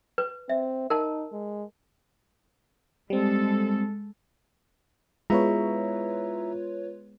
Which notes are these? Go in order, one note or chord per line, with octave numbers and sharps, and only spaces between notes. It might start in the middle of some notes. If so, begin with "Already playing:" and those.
B4
C4 E5
D#4 A#4 A5
G#3
G3 G#3 C4 A4
G#3 B3 E4 F4 B4 C#5 E5 A#5